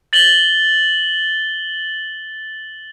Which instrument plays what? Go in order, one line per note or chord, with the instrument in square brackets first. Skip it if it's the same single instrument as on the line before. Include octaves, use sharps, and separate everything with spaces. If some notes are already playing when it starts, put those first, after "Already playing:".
[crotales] A6 F#7 G7